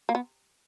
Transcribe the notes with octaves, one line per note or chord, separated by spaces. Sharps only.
A#3
B3